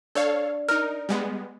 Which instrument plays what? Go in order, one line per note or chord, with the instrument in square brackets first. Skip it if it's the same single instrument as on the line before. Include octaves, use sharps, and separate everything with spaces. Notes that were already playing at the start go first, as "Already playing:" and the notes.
[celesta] D4 D5 [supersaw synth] A4 C#5 F5
[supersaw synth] D#4 A#4 [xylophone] F6
[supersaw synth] G3 G#3 B3